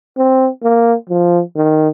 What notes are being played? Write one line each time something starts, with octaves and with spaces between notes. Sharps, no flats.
C4
A#3
F3
D#3